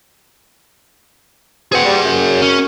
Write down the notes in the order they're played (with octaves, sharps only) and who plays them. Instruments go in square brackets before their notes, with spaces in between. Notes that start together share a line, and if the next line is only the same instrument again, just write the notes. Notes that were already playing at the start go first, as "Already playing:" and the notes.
[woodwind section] D2 B2 C4 [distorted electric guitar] G#4 F#5
[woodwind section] G3
F#2
[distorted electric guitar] C#4